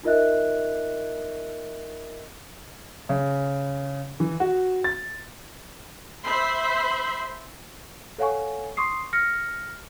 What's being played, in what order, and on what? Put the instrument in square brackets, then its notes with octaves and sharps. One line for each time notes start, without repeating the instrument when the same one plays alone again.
[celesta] D#4 F4 A#4 D#5 E5 F#6
[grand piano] C#3
E3
F#4
A6
[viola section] C5 E5 B5 C6
[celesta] A4 C#5 F5 F#5 G#5 C#6
C6 C#6 D#6 C7
F6 A#6 C#7